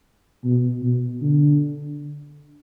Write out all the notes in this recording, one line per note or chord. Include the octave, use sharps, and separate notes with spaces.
B2
B2
D3